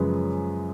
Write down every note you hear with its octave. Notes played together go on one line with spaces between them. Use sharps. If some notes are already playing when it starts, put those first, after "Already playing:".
Already playing: F#2 C#3 F3 G#3 B4